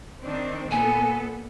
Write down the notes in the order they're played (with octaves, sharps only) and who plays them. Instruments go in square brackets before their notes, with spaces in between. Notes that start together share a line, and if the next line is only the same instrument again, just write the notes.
[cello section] D#3 C4 D4
[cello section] A#2 B3 A4 [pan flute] G#5